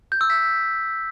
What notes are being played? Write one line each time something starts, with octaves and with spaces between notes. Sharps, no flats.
G6
E6
B6